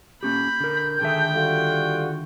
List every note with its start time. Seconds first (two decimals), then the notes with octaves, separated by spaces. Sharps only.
0.23 A#3 C#4 G4 B5 G6
0.60 D3 A#4
1.01 D3 D#3 G#4 A4 E5 G5
1.35 G3 F4 F#4 A4